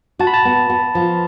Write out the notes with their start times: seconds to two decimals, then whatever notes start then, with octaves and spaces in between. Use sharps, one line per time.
0.19 F#4 A5
0.27 B5
0.34 A5
0.45 B3
0.70 B3
0.95 F3